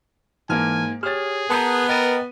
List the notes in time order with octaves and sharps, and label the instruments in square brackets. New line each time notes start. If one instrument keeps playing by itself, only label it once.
[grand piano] G#2 A#3 [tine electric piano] E3 A5 F6 [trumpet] G#5
[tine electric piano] G4 C#5 [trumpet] G#4 [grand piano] F6 A6
[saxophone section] B3 [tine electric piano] A#4 D#6 G6 [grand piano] A5 A#5
[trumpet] A#4 [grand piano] B4 D#7 [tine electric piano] D#5 G5 A6